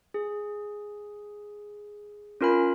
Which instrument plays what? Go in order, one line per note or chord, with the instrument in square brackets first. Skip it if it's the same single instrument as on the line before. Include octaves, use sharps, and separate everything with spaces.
[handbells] G#4
C#4 F4 A#4 G#5 B5